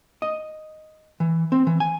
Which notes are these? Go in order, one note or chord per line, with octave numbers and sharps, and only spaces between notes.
D#5
E3
C4
E3
G#5